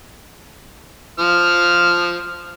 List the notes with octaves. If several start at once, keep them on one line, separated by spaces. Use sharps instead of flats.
F3 F6